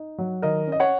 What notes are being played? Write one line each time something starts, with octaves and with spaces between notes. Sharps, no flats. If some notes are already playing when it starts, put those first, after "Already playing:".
Already playing: D#4
F#3
D#3 A#4 D#5
C#4
D#5
C#5 F#5